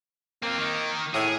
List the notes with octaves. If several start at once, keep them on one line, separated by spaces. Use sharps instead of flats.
A#3 C4 F4
D#3
A2 G#4